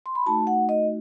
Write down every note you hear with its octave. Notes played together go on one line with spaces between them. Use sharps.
C6
B5
A3 D#4 F#4 A5
F#5
D#5